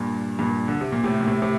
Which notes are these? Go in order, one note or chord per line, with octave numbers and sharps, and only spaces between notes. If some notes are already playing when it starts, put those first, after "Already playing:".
Already playing: G2 A#2
G2 A#2
D3
C3
A#2
A2 C3
A#2
A2 C3
A2 C3